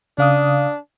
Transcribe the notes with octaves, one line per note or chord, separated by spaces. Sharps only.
C#3 D4 F5 D#6